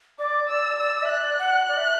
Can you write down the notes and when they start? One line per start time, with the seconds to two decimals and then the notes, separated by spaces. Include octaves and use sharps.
0.19 D5 D6
0.49 D5 E6
0.79 D5 E6
1.03 E5
1.09 D5 F#6
1.39 F#5
1.69 D5
1.78 E5